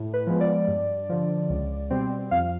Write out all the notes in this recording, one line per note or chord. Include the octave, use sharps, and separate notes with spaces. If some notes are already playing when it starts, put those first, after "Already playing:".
Already playing: A2
B4
F3 G#3 B3
D5
G2
D3 F3
C#2
B2 G3 C4
F2 F5